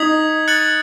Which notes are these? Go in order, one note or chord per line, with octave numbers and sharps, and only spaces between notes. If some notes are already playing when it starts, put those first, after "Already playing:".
Already playing: D#4 D#6 G#6 B6 F#7
F#6 A6 C#7 F#7